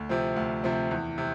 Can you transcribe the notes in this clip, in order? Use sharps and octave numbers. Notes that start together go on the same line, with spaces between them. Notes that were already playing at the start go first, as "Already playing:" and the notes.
Already playing: D2
C3 F3 C4
D2
C3 F3 C4
E2
C3